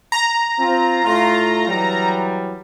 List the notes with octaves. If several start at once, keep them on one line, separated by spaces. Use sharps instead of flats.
A#5
C4 F4
A2 A3 F4
E3 F#3 G3